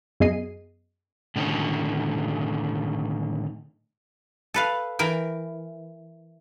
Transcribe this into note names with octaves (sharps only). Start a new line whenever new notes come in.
F#2 B3 G#4 D#5 C7 D#7
A2 D3 D#3 C#4
A4 B4 F5
E3 A#4 G5